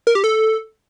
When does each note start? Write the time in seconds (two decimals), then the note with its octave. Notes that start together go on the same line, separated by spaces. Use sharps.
0.07 A#4
0.15 G4
0.24 A4